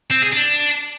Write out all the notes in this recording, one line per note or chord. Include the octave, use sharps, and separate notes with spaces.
C4
G#4
D4